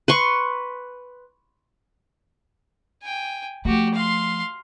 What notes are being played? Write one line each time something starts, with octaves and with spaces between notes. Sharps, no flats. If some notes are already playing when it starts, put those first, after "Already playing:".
B4 C6 C#6
G5 G#5
F3 A3 F#4 G4
F5 C6